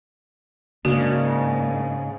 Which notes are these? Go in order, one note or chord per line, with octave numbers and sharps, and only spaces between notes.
G#2 C#3 A#3 D4 F#4